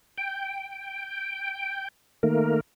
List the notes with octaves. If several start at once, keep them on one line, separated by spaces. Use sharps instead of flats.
G5
D#3 A3 A#3 A#4